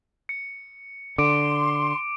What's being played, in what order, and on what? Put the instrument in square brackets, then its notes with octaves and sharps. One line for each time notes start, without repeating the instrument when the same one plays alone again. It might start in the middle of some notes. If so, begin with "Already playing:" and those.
[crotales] C#7
[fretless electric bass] D3 [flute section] C6 [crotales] D6 D7